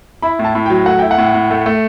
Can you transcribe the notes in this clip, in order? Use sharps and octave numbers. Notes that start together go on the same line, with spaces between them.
E4 B5
A2
A5
A2
G5
F#3
A3 F#5
E4 G5
F#5
A2
A2
A3
A3